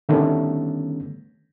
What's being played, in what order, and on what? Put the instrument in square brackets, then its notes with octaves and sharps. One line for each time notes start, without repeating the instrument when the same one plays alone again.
[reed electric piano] D3 D#3 G3 A3 B3 C#4